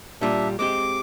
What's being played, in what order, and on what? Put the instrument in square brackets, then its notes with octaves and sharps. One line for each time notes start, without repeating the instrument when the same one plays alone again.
[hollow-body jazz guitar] A#2 G3 F4 [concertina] D4 E5
[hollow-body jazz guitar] G#3 C4 G4 [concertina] D6